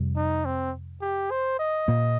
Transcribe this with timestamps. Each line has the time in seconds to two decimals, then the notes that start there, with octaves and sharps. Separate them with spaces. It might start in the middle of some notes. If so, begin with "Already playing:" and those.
Already playing: F2 C3 G3
0.16 D#4
0.45 C4
1.02 G4
1.31 C5
1.59 D#5
1.88 A#2 A#3